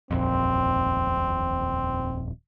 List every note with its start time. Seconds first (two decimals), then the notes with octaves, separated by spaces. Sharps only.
0.11 D#1 A#1 F2 C4